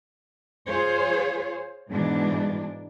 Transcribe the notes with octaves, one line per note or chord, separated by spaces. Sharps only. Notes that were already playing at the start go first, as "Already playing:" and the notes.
F4 G#4 C5 C#5
G#2 B2 E3 D4